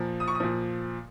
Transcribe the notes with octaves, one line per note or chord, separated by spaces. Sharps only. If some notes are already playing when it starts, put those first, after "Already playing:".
Already playing: A#2 F3
D#6
C#6
D#6
A#2 F3